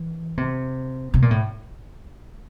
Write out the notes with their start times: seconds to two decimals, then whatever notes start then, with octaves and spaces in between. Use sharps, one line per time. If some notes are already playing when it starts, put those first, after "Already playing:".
Already playing: E3
0.37 C3
1.14 C3
1.22 A#2
1.31 A2